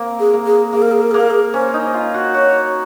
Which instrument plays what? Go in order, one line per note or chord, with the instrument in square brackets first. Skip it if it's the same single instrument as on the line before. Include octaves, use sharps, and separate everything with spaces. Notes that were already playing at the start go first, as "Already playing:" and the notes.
Already playing: [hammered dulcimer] A#3 C4
[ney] G#4
[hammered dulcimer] A#3
[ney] G#4
[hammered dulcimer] A#3 [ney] G#4
[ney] A#4
G#4
A#4
[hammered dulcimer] A#3 [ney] G#4
[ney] A#4
G#4
[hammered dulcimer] C#4 [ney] C5
[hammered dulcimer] D#4
F4
F#4
[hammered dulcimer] F#4 [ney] C#5